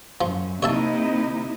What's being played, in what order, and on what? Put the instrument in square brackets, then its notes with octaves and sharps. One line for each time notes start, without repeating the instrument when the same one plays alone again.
[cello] F#2 [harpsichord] F3
[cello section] C3 D#4 E4 [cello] A#3 D#5 [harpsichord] C#5 E5 A5